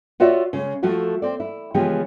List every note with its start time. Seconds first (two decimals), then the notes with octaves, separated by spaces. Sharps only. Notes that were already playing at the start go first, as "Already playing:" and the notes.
0.20 F4 F#4 C#5 D5 E5
0.53 C#3 G#3
0.83 F3 A3 F#4 A4
1.22 C4 D5
1.40 E4
1.74 C#3 E3 F3 G#3 B3 G4